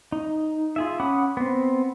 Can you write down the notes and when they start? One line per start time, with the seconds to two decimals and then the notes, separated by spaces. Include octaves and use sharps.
0.12 D#4
0.76 F4 G#4 E5
1.00 C#4 F#5 B5 D6 D#6
1.37 B3 C4